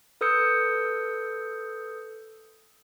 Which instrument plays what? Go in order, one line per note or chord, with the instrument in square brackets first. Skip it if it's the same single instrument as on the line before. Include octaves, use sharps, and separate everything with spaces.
[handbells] A4 B4 D#6 E6 G6 C#7